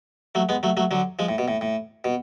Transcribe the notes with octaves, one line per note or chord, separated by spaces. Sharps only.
F#3 A3
G#3 B3
F#3 A3
F#3 A3
D3 F#3
F3 G#3
A2
B2
A2
A2
B2